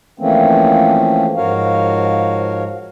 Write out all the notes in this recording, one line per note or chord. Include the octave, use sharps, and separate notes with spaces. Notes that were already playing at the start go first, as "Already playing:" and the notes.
E3 F3 A3 A#3 C4 C#4
G#2 F3 F#4 A#4 C#5 F5